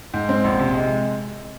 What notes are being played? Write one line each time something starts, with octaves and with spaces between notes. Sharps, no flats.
G#2
C4
A#1
C3
G#3